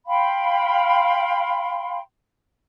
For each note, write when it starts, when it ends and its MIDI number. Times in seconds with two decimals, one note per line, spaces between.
0.06 1.99 77
0.06 1.99 79
0.06 1.99 83
0.06 1.99 84